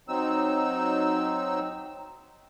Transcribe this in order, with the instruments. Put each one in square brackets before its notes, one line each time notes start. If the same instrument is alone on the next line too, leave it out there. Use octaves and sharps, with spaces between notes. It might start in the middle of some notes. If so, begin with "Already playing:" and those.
[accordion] F#3 C4 D#4 E6